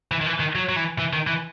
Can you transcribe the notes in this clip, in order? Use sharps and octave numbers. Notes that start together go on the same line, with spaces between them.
E3
D#3
E3
D#3
F#3
F#3
E3
E3
D#3
E3